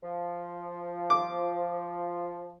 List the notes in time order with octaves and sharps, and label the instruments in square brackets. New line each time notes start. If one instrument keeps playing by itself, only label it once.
[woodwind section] F3
[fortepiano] D6